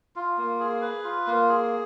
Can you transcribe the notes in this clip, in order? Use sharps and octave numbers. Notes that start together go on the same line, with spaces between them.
F4
A#3
G#4
B4
F4
A#3
G#4